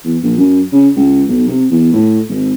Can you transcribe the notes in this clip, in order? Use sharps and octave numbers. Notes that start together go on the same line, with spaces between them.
E2
A#1
F#2
C#3
C#2
B1
C3
E2
A2
G#1